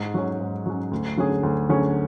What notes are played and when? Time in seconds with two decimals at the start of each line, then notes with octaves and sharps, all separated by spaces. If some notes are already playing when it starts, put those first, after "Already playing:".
Already playing: G#2
0.14 F#3 C#4
0.40 G#2
0.66 F#3 C#4
0.91 D2
1.17 D3 F#3 C#4 G#4
1.43 D2
1.69 D3 F#3 C#4 G#4